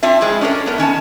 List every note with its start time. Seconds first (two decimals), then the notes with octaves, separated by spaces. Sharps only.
0.03 C4 D4 F4 E5
0.21 F3 G#3 C4 E4
0.41 C#4 D4 A4 A#4
0.66 A3 B3 A#4
0.78 D#3 C#4 G#5 A5